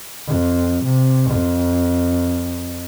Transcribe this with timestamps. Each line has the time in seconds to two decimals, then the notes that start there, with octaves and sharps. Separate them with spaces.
0.28 F2
0.85 C3
1.31 F2